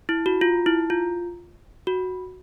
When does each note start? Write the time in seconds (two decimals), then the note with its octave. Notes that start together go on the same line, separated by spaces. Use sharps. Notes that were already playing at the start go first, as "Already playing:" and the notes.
0.09 E4
0.26 F#4
0.41 F4
0.66 E4
0.90 F4
1.87 F#4